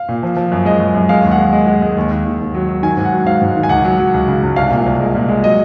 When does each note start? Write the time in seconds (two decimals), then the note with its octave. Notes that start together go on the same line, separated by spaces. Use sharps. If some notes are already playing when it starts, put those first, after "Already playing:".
Already playing: F5
0.09 A#2
0.23 F3
0.37 F3
0.52 F#2
0.65 G#3 D#5
0.80 F#2
0.95 F#2
1.09 G#3 F5
1.24 D#2
1.31 F#5
1.38 G#3
1.53 G#3
1.67 G#3
1.82 G#3
1.97 D#2
2.11 D#2
2.25 D#2
2.40 D#2
2.54 F#3
2.69 F#3
2.83 D#3 G#5
2.97 G#2
3.05 F#5
3.12 F#3
3.26 G#2 F5
3.42 G#2
3.56 D#3
3.63 G#5
3.69 C#2 F#5
3.85 F#3
3.99 F#3
4.14 C#2
4.28 C#3
4.43 C#2
4.56 C2 F5
4.71 A#2
4.86 C2
5.00 G#3
5.15 A#2
5.29 G#3
5.44 F#3 D#5